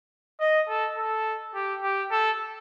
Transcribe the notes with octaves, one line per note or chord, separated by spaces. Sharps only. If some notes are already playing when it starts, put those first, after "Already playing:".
D#5
A4
A4
G4
G4
A4